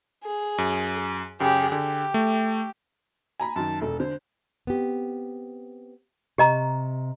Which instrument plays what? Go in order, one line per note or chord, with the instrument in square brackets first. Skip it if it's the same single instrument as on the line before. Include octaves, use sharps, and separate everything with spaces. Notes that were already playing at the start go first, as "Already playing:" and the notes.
[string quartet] G#4
[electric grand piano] F#2
[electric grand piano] F#2 C#3 [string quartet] G4 G#4
[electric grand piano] D3 [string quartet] G4
[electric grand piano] A3
[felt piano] G#5 A#5 B5
[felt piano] F#2 D#3 [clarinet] A5
[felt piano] E1 [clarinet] A4
[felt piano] D3 [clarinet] C5
[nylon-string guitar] B3 C4 G4
[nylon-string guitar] C3 [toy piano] G4 D#5 A#5